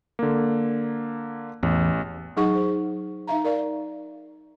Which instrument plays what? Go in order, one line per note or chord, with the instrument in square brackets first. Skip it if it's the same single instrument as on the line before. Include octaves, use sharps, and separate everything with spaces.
[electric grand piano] D3 A#3
[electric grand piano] A1 [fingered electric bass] E2
[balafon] F#3 D#4 G#4 F#5 C#6
C5
D#4 E5 F5 A#5
A#4 D5 F5